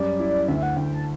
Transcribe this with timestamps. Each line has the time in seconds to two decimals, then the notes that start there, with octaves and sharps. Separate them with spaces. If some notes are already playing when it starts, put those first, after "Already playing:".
Already playing: F#2 G3 D5
0.20 E4
0.48 D2 E5
0.63 F#5
0.77 D2 G5
0.94 A5